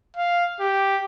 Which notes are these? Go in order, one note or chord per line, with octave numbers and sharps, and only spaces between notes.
F5
G4